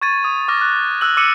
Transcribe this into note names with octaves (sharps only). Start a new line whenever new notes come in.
C#6 G#6 A6 D#7
D#6
D6 F6 A#6
F#6
E6 F#6 F#7
D6 E6 C#7 D#7 E7